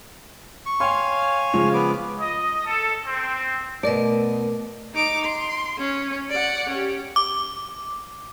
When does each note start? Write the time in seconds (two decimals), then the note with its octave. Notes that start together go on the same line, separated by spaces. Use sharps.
0.66 C#6
0.80 C#5 F5 G5 G#5 C6
1.53 C#3 F3 G#3
1.74 B3 D6
2.20 D#5
2.66 A4
3.05 C4
3.83 B2 A3 A#4 D5 D#5
4.94 D#4 D6
5.24 C6
5.78 C#4
6.30 D5 F#5
6.69 C#4 G4
7.16 D6